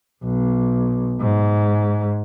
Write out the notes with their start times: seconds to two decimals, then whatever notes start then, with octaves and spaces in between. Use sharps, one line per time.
0.24 B1
1.21 G#2